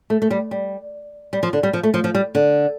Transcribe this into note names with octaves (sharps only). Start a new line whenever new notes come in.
A3
A3
G3
G3
G3
F3
D3
G3
F3
A3
F3
F3
G3
D3